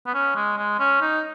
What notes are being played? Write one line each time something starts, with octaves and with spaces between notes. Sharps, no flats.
B3
C#4
G#3
G#3
C#4
D#4